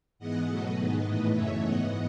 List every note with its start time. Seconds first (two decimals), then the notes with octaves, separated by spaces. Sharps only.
0.19 G#2 E3 G#3 B3 D#5 F#5
0.47 B2 F#3 A3 B4 D#5
0.76 G#2 D#3 G#3 B3
1.04 A2 E3 A3
1.33 F#2 C#3 E3 A3 C#5 E5
1.61 G#2 E3 B3 D#5 F#5